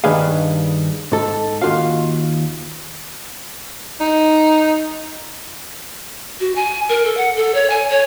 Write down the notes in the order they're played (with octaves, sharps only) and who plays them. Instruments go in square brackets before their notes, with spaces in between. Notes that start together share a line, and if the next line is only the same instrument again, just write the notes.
[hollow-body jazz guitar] G2 D#3 D4 G#4 B4 F5
G#2 A4
D#2 F4 F#4 F5
[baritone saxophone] D#4
[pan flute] F#4
G#5
A#4
A4
F#5
A4
C#5
G#5
C#5